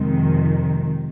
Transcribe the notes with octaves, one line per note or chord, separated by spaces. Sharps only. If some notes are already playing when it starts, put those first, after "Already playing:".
Already playing: F2 C3 D#3 G#3